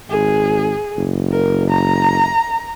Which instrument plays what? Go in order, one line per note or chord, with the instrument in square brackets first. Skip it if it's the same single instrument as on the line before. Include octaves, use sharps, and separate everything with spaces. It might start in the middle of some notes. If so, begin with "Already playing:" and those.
[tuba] G#1 [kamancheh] G#4
[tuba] F#1
[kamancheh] A#4
A#5